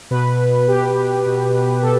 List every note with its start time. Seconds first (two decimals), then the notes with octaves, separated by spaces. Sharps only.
0.11 B2 B4
0.68 B2 G4
1.26 B2
1.82 B2 A4